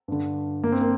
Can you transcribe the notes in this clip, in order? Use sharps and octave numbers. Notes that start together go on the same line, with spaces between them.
G2 D3
G2 D3 A#3
C4
A#3